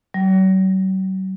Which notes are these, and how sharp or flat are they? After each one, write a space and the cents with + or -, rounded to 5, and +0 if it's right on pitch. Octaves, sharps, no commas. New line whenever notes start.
F#3 +40